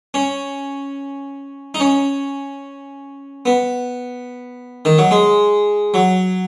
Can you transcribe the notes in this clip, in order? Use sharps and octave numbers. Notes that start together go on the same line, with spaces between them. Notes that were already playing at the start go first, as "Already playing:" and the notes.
C#4
D#4
C#4
B3
D#3
F#3
G#3
F#3